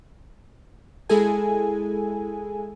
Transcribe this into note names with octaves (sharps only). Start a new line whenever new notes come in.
G#3 E4 G#4 A4 G#5